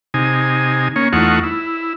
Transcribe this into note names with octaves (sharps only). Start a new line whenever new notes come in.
C3 D#4 G#5
A#3 C#4 C#5
E2 A3 D#4 F4 F#5 C#6
E4